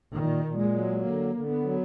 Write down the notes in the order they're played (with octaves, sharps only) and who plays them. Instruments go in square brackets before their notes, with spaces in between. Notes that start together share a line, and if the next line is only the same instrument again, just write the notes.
[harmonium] A#2 [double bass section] D#3
[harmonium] A#2
[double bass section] G#3
[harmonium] F#3
[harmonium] D3 [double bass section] A#3
[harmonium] D3
[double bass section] B3
[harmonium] F#3